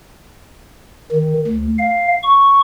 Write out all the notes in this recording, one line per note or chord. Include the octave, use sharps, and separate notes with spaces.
D#3
D2
F5
C#6